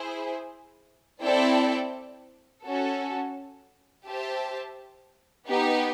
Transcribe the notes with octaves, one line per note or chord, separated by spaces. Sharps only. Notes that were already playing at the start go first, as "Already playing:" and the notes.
Already playing: E4 G#4 C5
C4 E4 A4 D5 G5
C#4 F#4 A4
G4 C5 E5 A5
B3 D#4 G4